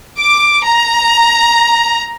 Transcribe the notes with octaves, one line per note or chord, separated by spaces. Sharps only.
D6
A#5